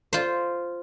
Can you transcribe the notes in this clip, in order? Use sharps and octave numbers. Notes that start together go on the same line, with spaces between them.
F4 C5